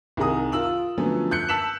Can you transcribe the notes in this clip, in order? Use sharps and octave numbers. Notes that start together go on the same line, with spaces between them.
C2 D#3 G#4 A#5 D#6
F4 A#4 E6 F#7
D3 F3 F#3 A3 B3 C#4
F#6 G6 C#7
A5 E6 B6 E7 F#7